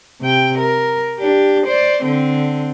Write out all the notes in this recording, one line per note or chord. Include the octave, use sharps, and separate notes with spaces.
C3 G5
A#4
D4 G4
C5 D5
D3 C4